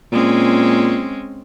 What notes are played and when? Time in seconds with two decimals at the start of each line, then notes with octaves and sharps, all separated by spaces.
0.12 A#2 G#3 C4 C#4